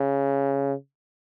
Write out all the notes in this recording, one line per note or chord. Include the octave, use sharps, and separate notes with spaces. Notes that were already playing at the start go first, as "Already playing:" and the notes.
Already playing: C#3